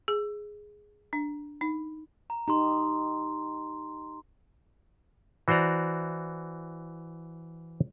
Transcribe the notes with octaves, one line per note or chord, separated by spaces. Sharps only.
G#4
D4
D#4
A#5
D#4 G4 A#5 C6
E3 F#4 C5 D5 A#5